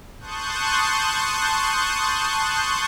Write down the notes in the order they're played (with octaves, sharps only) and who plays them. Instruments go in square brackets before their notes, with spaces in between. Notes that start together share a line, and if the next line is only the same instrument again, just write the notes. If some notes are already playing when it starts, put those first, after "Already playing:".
[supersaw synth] A5 C6 C#6 D#6 F#6 G6